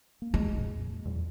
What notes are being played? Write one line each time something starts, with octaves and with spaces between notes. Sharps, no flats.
A#3
G#3
F2 A#2
E2 A#2 F#3